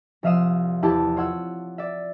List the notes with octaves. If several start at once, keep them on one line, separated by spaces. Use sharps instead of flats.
C2 F3 E5 F5 D#6 E7
E2 E4 G4 A5
F4 C#5 F#5 E6
D5 E5